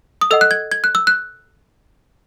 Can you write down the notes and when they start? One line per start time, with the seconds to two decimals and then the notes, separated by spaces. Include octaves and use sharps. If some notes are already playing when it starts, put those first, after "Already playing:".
0.21 D#6
0.31 A4 D#5 F#5 E6
0.41 F#6
0.51 G#6
0.72 G#6
0.84 F#6
0.95 E6
1.07 F#6